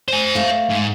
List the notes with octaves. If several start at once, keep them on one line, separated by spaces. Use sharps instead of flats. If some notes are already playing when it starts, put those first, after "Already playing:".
C5 G#5
A3 F5
G#2